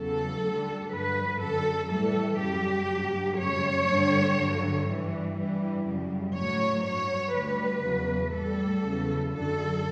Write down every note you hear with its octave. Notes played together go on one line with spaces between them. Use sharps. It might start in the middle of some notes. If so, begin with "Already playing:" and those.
Already playing: E2 C#3 F#3 A4
D2 D3 G3
G2 F#3 B4
F#2 D3 F#3 A4
A2 E3 G3 A4
F#2 C#3 G3 G4
G2 F#3
F#2 C#3 G3 C#5
G2 D3 G3
G2 D3 F#3
G2 E3 G3
G2 E3 G3
F#2 C#3 G3
A2 F#3 C#5
G2 F#3 C#5
D2 D3 G3 B4
E2 C#3 F#3
A2 G3 A4
E2 C#3 F#3
F#2 D3 F#3 A4